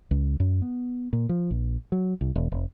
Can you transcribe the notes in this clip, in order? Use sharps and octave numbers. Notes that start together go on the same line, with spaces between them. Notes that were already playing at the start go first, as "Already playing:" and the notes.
C#2
F#2
B3
A#2
F3
A#1
F#3
C2
E1
F1